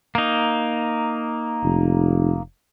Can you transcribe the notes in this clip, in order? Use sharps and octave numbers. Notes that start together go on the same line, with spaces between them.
A#3 D#4
F1